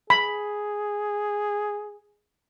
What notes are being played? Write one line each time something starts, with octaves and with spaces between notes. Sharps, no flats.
G#4 B5